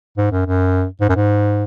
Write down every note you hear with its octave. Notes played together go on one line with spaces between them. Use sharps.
G#2
F#2
F#2
G#2
F#2
G#2